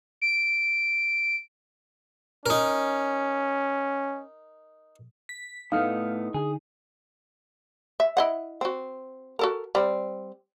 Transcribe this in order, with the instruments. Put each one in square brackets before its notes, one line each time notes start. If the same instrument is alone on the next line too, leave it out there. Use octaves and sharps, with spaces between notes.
[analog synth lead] D7
[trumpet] C#4 [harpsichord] D#4 A#4
[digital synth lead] B6
[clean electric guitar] A2 A3 B3 [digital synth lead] D#4 [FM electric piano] F5 F6
[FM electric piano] D3 [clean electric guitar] G#4
[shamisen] E5
E4 D#5 F#5
C4 F#4
F#4 A4 A#4
G3 C4